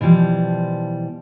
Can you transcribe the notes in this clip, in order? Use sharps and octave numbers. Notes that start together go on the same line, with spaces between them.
B2 E3 F3 G3